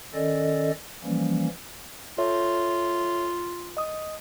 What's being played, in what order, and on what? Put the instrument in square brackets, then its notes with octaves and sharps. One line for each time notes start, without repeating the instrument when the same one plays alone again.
[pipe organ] D#3 C#4 A4 D5 D#5
E3 F3 G3 A#3 C#4
[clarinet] F4 [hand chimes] A4 C#5 E5
[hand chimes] D#5 D#6